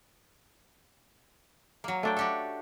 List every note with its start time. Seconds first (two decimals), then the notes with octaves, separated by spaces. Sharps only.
1.84 F#3 A#3
2.03 A3 D4 G5
2.17 F#4 G4 A4